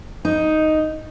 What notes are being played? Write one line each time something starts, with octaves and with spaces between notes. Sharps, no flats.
D#4